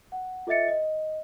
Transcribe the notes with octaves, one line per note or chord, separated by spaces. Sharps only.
F#5
F4 A4 D#5 E5 A6 C#7
D#5